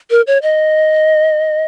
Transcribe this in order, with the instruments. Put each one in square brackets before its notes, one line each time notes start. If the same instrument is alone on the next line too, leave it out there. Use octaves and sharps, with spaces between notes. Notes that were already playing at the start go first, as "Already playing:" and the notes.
[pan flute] A#4
C#5
D#5